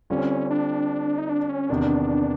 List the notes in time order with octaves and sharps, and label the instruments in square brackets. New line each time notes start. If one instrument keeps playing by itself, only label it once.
[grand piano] D3 G3 C4 F4 [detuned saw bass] C#4
[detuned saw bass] D4
D#4
D4
C#4
[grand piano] E2 C3 D#3 [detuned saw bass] D4